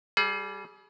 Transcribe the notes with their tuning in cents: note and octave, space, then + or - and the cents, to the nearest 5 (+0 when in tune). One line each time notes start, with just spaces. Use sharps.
G3 -10 G#4 +30